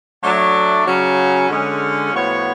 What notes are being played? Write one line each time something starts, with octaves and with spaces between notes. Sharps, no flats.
F#3 A3 D4
C#3 F#3 C#4
D3 G#3 C#4
A2 F3 B3 F#4 C#5